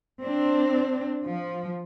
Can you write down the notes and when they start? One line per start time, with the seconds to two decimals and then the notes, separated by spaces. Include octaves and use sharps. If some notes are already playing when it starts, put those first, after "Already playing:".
0.23 C4 D4
1.24 F3